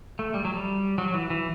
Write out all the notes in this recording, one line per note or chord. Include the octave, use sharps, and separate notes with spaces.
A3
G3
F#3
G3
F#3
E3
E3